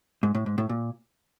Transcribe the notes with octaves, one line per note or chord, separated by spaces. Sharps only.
G#2
A2
G#2
A2
A#2